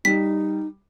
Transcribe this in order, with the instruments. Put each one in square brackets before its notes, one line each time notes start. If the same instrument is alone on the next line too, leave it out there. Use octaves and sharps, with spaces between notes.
[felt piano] G3 [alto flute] D#4 [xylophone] B6